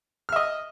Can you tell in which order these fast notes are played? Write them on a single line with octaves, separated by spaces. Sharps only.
F6 E5 D#5